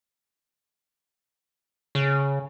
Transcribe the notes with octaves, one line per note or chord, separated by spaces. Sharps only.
C#3